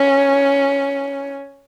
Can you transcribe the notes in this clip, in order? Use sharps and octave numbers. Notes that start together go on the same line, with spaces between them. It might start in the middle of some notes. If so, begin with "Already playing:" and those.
Already playing: C#4